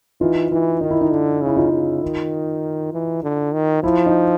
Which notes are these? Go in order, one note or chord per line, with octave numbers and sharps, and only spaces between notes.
E3 D#4 F4
E3 E4
D#3 D#4
E4
D#4
D3
C#3
E4
D#4 F4
C#3
D#3
E3
D3
D#3
F3 E4
D#4